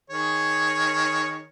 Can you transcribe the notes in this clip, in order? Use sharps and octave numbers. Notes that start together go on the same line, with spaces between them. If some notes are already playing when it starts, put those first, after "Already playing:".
D#3 G#4 C#5